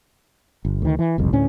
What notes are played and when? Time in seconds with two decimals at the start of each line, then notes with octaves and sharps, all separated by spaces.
0.65 G1
0.82 D2 D#3
0.99 E3
1.18 F#1 C2 F2
1.33 D2 A2 C#4